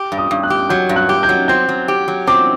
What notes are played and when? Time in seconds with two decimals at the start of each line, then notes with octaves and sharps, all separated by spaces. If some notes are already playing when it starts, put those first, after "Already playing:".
Already playing: G4
0.12 G2
0.17 D#6
0.31 G2
0.43 F#6
0.50 G4
0.69 F#3 G6
0.89 G2
0.96 F#6
1.09 G4
1.23 G6
1.29 F#3
1.48 C4 G6
1.69 F#3
1.88 G4
2.08 F#3
2.27 C4 D6